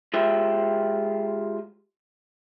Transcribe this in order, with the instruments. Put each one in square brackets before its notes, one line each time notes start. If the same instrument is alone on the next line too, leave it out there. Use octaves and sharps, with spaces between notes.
[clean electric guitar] G#3 F4 G4 C5 E5